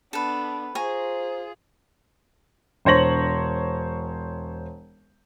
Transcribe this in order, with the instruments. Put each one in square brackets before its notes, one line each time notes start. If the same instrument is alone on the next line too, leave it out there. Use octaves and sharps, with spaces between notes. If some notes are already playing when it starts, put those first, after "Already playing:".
[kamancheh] B3 D4 [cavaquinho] A4 B4
[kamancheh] F4 G#4 [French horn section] C5 [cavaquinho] G#5 A#5 C#6
[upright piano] E1 C5 C#5 A#6 F#7